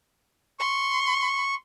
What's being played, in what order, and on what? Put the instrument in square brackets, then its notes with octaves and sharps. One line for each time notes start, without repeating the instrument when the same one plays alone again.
[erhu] C6 [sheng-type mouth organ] C#6